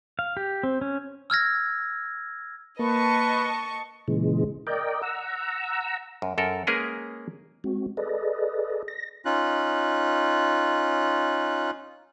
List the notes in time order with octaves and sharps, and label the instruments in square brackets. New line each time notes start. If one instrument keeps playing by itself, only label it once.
[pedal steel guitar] F5
G4
C4
C#4
[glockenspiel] E6 F6 G#6 A#6
[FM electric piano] A#3 [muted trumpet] B4 [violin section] D#5 A5 C#6
[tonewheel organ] A#2 C#3 E3 G#3
A#4 D5 D#5 G5
F#5 A#5 E6
[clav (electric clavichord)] F#2
F#2 A4 A#4
G#3 A#3 C#4 G#4 A#4 B4
[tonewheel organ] G#3 C4 F#4
G#4 A4 B4 D5 D#5
A#6
[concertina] C#4 D#4 F4 F#6